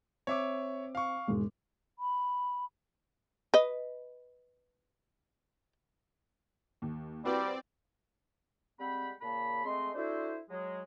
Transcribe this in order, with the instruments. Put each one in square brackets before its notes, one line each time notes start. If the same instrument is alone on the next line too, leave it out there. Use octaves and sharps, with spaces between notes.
[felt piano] C4 [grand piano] C#5 E5 D6
[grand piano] F5 C#6
[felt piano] E1 G#2 G#3
[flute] B5
[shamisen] B4 D#5
[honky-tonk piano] D#2
[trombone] G3 [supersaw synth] C4 D5 [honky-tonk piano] E4 F#4 B4
[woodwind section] G3 G#3 C4 F#5 G5 B5
A#2 C#3 A#3 A5 B5
G#3 A3 C4 D#5 C6
D4 E4 F#4 A4 C5
F#3 G#3